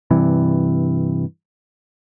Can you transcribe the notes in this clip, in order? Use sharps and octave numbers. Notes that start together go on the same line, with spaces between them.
G2 C3 E3